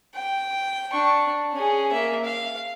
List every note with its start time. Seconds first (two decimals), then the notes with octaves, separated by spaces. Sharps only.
0.15 G5
0.93 D4 C#6
1.53 C#4 G#4
1.92 A#3 E5
2.25 F5